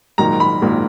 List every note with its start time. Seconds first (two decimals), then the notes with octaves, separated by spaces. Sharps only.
0.18 A#1 G#2 D#3 F#3 A#3 A#5
0.40 B5
0.62 A#1 G#2 D#3 F#3 A#3